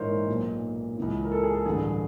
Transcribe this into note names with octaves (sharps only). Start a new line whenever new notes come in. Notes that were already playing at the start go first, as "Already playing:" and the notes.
Already playing: A#1 G#2 E3 A#4 C5 C#5 D#5
B1 A#2
C#2 C#3 E3
A#4
A4
G#4
A4
A1 G2 D3 G#4